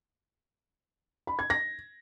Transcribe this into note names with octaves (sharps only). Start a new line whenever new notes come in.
B5
G#6
A#6